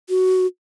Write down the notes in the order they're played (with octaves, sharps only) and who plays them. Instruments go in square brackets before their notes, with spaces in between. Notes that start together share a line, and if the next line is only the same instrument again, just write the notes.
[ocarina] F#4